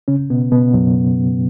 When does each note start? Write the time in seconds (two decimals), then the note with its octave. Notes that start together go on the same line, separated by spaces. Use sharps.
0.08 C#3 C#4
0.30 B2 B3
0.52 B2 B3
0.74 F#2 F#3